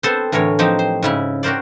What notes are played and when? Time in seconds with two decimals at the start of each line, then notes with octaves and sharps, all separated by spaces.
0.03 B3 C4 A4 C5
0.32 A2 D3 E3 A#4 C#5
0.59 F3 F#3 C4 D#4 G4
0.79 C5
1.03 G#2 C#3 E4
1.43 F#4 G4 A#4 C5 D5